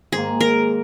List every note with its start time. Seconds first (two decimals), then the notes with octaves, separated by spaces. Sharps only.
0.12 G#2 D#3 A#3 G#4
0.41 A#4